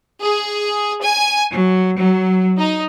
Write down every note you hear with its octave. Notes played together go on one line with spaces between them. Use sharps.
G#4
G#5
F#3
F#3
D#4